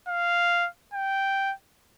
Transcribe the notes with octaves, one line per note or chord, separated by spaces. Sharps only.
F5
G5